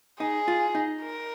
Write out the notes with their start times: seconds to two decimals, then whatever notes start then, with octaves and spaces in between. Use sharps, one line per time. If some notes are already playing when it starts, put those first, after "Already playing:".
0.20 D#4 G#4
0.48 F4
0.75 D#4
1.02 A#4